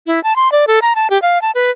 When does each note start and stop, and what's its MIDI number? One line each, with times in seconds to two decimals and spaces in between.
0.07 0.22 64
0.24 0.36 81
0.36 0.51 84
0.52 0.65 74
0.67 0.79 69
0.82 0.93 82
0.96 1.10 81
1.10 1.20 67
1.22 1.41 77
1.42 1.51 81
1.55 1.71 71